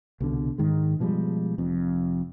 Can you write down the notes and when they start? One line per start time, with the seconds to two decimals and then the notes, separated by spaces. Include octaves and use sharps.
0.20 C2 B2 D3
0.58 G#2 D#3 G#3
1.00 B2 F3 G3 G#3
1.58 F1 F2